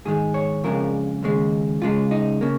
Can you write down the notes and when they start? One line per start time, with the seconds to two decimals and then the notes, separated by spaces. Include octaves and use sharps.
0.05 G#2 D#3 G#3 G#4
0.34 C#5
0.64 F2 C#3 G#3 A#4
1.23 D#2 C#3 G#3
1.82 C#2 C#3 G#3 F4
2.11 D#4
2.41 C#3 A#3